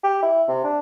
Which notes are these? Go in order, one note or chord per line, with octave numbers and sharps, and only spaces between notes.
G4
E4
C3
D4